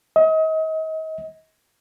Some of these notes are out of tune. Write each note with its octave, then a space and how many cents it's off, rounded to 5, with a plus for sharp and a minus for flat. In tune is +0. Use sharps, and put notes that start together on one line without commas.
D#5 +35